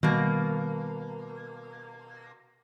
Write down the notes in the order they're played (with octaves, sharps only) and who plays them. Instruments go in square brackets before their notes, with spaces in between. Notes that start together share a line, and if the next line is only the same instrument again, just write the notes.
[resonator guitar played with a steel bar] B2 A#3 [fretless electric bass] D#3 G3